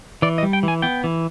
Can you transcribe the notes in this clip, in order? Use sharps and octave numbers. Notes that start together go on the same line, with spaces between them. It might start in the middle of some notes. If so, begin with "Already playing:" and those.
E3 D5
D#5
G3
G5
E3 G#5
B3 G5
E3